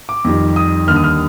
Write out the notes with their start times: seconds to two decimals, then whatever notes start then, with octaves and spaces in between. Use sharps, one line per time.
0.09 D6
0.24 F2 D#3 G3
0.56 D#6
0.87 D#2 D3 G3 F6
0.96 D#6
1.04 F6